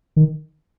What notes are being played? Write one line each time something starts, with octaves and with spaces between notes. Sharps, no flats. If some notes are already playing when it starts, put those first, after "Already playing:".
D#3